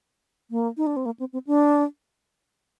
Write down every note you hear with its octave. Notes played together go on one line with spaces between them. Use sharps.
A#3
D#4
D4
C4
A#3
C4
C4
D4